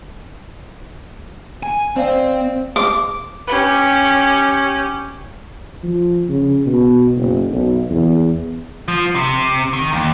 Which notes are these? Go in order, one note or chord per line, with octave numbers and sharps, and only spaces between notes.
G#5
C4 C5 D5 F5
D6
C#4 G4
F3
C#3
B2
F#1
B1
E2
F3
C3
D#3
D#2